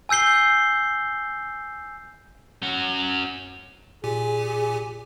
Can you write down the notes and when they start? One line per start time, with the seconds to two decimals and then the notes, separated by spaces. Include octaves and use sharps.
0.09 G#5 E6 G6 C7 G7
2.63 C#4 F#4
4.04 A#2 G4 G#4 G#5